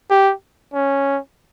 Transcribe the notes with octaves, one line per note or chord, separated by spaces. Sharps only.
G4
C#4